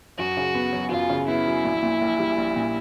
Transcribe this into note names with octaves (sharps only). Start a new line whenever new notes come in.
F#2 F#4
C#3
B3
F#3
F#2 F4
C#3
B3 E4
F#3
A#1
A#2
A#1
G3
A#1
A#2